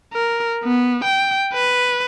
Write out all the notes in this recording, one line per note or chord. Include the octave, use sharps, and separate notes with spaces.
A#4
B3
G5
B4